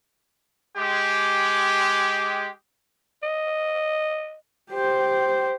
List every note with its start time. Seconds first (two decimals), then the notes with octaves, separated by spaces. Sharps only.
0.77 G#3 G4
3.23 D#5
4.71 G4 C5